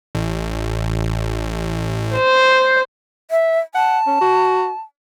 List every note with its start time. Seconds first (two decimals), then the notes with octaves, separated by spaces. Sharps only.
0.15 A1
2.15 C5
3.31 E5
3.75 F#5 A5
4.07 C#4
4.21 F#4